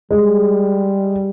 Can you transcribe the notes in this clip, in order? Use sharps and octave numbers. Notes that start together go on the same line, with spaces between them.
G3 G#3